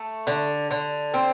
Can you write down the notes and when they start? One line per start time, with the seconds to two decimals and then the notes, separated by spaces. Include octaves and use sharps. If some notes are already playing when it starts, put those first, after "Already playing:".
Already playing: A3
0.27 D3
0.71 D3
1.14 C4